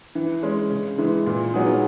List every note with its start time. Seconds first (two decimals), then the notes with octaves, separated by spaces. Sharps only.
0.15 E3
0.42 G#3 C#4
0.70 C#3
0.98 E3 G#3
1.26 A#2
1.53 F#3 B3 D#4 G#4